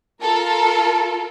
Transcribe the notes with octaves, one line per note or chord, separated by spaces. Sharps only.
F4 A4 A#4